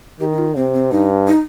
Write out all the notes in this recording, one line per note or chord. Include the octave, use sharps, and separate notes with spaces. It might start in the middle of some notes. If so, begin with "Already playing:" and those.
D#3 G4
D#4
F4
C3 C4
C4
G2 D#4
D#4